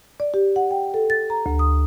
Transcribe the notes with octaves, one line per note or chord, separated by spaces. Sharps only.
D5
G4
F#5
G5
A4
A6
A#5
D2
D#6